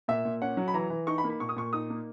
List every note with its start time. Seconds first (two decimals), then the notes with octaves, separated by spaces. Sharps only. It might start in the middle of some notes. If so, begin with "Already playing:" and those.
0.08 A#2 E5
0.25 A#2
0.42 C#4 F#5
0.57 F#3
0.68 B5
0.74 E3 A#5
0.90 E3
1.07 D#4 C#6
1.18 B5
1.24 A#3
1.30 B5
1.40 A#2 C#6
1.49 D#6
1.56 A#2 C#6
1.73 D#4 D#6
1.90 A#3